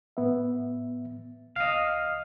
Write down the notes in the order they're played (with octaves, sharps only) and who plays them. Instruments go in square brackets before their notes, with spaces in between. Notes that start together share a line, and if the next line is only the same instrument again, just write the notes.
[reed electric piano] A2 B3 E5
[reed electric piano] C#2 [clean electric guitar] D#5 F5